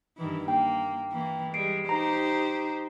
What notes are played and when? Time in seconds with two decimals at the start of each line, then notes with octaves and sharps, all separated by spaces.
0.17 G2 D#3 E3
0.48 A#3 G5
1.12 E3 A#3
1.54 G3 G#3 C7 D7
1.89 D#4 G4 C5 A#5